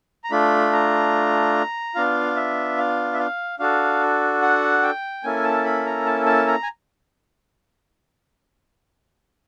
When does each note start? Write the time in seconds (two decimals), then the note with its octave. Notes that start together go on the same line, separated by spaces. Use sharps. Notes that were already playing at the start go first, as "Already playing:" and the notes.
0.24 A#5
0.31 A3 D4 F4 B5
0.72 A#5
1.95 B3 D4 F4 F5
2.36 E5
2.78 F5
3.13 E5
3.19 F5
3.59 D4 F#4 A4 F5
4.42 F#5
4.83 G5
5.23 A#3 C#4 E4 A4 G#5
5.44 A5
5.65 B5
5.86 A#5
6.06 A5
6.26 A5
6.47 A#5
6.63 G#5